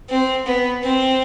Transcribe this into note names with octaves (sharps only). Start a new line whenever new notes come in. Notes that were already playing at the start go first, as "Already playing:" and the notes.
C4
B3
C4